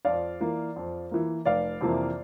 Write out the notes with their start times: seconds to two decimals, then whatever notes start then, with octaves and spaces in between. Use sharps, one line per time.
0.05 F2 D5 F5
0.41 E3 A#3
0.76 F2
1.11 E3 A#3
1.45 F1 D5 F5
1.81 F2 C3 E3 A#3